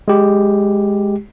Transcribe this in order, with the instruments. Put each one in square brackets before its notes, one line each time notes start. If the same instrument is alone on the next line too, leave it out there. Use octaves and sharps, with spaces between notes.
[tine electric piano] G#3 G4